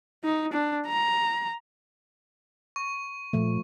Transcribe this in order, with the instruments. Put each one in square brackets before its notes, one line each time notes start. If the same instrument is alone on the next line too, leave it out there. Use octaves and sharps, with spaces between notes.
[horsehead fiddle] D#4
D4
A#5
[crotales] C#6
[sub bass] A#2 [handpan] F3 A3